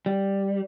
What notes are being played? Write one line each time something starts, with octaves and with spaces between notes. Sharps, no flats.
G3